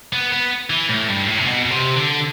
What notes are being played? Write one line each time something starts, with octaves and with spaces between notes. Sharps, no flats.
B3
B3
E3
A2
G2
A2
C3
B2
B2
C3
D3